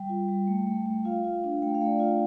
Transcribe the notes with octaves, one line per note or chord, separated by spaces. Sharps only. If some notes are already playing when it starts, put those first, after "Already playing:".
Already playing: G3 G5
F4
G3
A3
A3
A3
F4 F5
F4
D4
A3 G5
F5
A3
D5
F4 F5